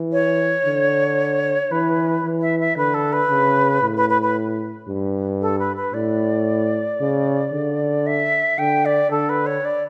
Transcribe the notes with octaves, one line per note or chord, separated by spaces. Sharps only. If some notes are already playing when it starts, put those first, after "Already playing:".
Already playing: E3
C#5
D3
E3 B4
E3
E5
E5
D3 B4
A4
B4
C#3
A2
B4
B4
B4
G2
A4
B4
B4
A2 D5
C#3
D3
E5
D3 G5
D5
D3 A4
B4
C#5
D5